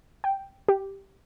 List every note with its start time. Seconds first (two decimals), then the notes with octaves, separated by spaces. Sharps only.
0.24 G5
0.68 G4